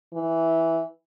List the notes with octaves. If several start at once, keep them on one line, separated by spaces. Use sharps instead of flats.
E3